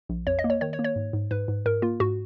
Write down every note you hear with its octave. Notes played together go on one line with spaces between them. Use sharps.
A#1
F2 C#5
D#5
A#3
C#5
D#3 C#5
C#5
A#3
C#5
G#2
G#2
G#2 B4
G#2
G#2 A#4
A#3 F4
G#2 F#4